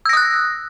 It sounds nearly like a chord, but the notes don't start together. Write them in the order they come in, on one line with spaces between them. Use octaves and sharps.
E6 A#6 D#6 F#6